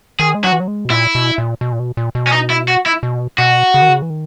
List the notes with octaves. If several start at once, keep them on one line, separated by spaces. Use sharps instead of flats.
D#3 G#4
G#3
F#3 F#4
E3
F#3
G#3
B2
A#2 E4
B2
A#2
B2
A#2
B2
A#2
B2
C#4
D#4
E4
F#4
E4
B2
B2 F#4
C#3
D#3
C#3
E3
D#3